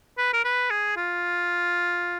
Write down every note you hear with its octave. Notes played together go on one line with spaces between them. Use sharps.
B4
A#4
B4
G#4
F4